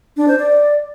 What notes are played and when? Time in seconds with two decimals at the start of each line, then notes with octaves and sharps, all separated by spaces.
0.17 D4
0.28 C5
0.39 D5